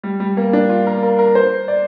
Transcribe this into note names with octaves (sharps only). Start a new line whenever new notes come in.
G3
G3
A#3
D4
F4
A#4
A#4
A#4
C5
D5